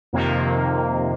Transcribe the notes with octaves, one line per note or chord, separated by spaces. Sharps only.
F2 C3 D#3 A#3